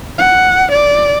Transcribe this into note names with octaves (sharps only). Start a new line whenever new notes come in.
F#5
D5